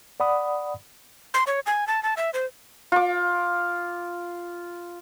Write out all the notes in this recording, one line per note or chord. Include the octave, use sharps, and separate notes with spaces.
D5 F#5 B5 D#6
C6
C#5
G#5
A5
A5
E5
C5
F4 D6